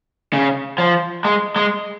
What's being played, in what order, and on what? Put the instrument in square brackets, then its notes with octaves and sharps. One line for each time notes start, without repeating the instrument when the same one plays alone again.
[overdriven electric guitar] C#3
F3
G#3
G#3